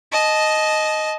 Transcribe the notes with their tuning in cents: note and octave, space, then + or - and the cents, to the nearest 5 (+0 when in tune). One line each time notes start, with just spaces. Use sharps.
D#5 +0 A5 -25